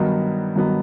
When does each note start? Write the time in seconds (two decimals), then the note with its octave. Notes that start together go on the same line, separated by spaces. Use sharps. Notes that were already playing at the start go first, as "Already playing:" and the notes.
Already playing: G2 D#3 F#3 B3 D#4
0.56 G2 D#3 F#3 B3 D#4